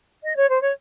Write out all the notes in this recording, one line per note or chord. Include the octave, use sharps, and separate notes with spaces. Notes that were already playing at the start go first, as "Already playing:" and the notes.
D#5
C#5
C5
C#5